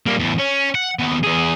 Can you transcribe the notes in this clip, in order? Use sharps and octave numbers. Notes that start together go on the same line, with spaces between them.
G3 A#3
E2 A2
C#4
F#5
D#2 B3
E2 G#4